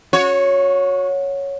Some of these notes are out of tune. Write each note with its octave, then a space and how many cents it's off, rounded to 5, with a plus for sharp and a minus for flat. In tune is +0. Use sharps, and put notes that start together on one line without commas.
F#4 -30 C#5 +0